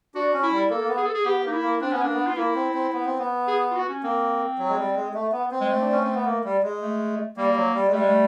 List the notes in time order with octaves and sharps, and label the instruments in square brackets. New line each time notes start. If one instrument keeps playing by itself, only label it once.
[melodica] D4 [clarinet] F#4
[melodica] C#4
[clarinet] E4
[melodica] G3
[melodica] A#3 [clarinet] A4
[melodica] A#3
B3
[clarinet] G#4
A4
G#4
[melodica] B3 [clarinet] G4
[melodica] A#3 [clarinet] D#4
[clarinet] E4
[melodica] A#3
[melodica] C4 [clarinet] D4
[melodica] B3 [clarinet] C#4
[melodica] A#3 [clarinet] D4
[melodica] B3
[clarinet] F4
[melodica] A#3 [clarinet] E4
[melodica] C4
C4
B3
C4
B3
[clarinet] G#4
F4
F#4
C#4
[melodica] A#3 [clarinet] C4
[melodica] F#3
G#3
G3
G#3
A3
B3
C4
[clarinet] G#3
A3
[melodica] D4
C#4
C4
B3
A#3
G3
G#3
[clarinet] A3
[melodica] G3 [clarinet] A#3
[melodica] G3
F#3
G3
G#3
[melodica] G3 [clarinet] A3
[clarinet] G#3
A3